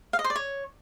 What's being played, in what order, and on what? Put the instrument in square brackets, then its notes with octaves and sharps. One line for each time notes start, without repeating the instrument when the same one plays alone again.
[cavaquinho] F5
D#5
C5
D5
C#5